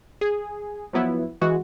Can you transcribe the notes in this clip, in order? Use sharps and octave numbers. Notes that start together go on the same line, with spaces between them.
G#4
F3 F#3 B3 E4
E3 G#3 F#4